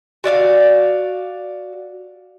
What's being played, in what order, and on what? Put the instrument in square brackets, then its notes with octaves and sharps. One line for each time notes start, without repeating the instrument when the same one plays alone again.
[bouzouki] F#4 D5 E5 F5